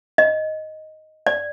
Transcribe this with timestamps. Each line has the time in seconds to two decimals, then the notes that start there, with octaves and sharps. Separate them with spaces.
0.18 D#5
1.27 D5